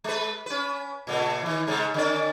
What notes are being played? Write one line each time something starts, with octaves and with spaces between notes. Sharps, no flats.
G#3 B4
C#4 B4
A#2 C#3 A3
D#3 E3
G#2 C#3 G#3
D3 C#4 D5